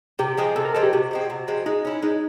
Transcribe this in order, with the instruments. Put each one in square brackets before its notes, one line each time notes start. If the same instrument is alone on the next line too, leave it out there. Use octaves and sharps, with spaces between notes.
[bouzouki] C3 [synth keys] G4
[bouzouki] F3 G#3 C4 [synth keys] G#4
[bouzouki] C3 [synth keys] A4
[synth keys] A#4
[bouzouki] F3 G#3 C4 [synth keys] A4
[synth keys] G4
[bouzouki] C3 [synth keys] F#4
[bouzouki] F3 G#3 C4
C3
F3 G#3 C4
[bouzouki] G#3 [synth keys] D#4
[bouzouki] C#4 E4
[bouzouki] G#3 [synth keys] D#4